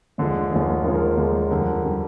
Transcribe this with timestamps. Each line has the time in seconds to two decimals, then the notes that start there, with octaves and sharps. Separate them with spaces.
0.18 D#2 D3 F3 G#3
0.51 D#2 D3 F3 G#3 G#4
0.62 A#4
0.74 A#4
0.84 D#2 D3 F3 G#3 A#4
0.95 A#4
1.06 C5
1.17 D#2 D3 F3 G#3
1.51 F2 D3 G3 A#4
1.85 D3 G3